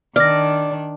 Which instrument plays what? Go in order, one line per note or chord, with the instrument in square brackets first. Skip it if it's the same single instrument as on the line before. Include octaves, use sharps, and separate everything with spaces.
[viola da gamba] D#3 D4 [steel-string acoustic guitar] D5 [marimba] F6 A#6